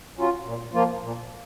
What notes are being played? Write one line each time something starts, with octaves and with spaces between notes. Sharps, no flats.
F#3 C#4 F4
A#2
F3 A#3 F4
A#2